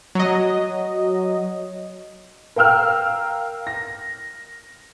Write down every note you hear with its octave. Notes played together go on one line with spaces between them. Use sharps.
F#3 D#5
A#4 F5 G5 E6 F6
A#6